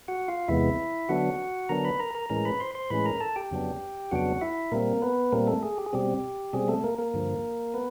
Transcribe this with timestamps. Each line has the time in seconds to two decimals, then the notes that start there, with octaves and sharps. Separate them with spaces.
0.08 F#4 F#5
0.28 F4 F5
0.48 E2 C3 E3 G#3 B3 E4 E5
1.09 D3 F#3 B3 D4 F#4 F#5
1.69 D3 F#3 B3 D4 A#4 A#5
1.85 B4 B5
1.99 A#4 A#5
2.15 A#4 A#5
2.29 A2 E3 G#3 C#4 A#4 A#5
2.45 B4 B5
2.60 C5 C6
2.75 C5 C6
2.90 A2 E3 G#3 C#4 B4 B5
3.05 A#4 A#5
3.20 A4 A5
3.36 G4 G5
3.51 F2 C#3 F#3 B3 D4
4.11 F2 C#3 F#3 B3 D4 F#4 F#5
4.41 E4 E5
4.71 A#2 G3 A#3 C4 A#4
5.02 B3 B4
5.32 A#2 G3 A#3 C4 A#4
5.47 A3 A4
5.63 G#4
5.78 G4
5.86 G#4
5.93 B2 G3 C4 G4
6.53 B2 G3 C4 G#4
6.68 A3 A4
6.84 A#3 A#4
6.98 A#3 A#4
7.14 G2 D3 F3
7.74 B3 B4